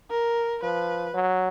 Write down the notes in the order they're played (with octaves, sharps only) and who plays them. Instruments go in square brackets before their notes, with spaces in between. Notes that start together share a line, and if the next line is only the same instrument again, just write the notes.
[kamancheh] A#4
[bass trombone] F3 [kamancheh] B4
[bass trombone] F#3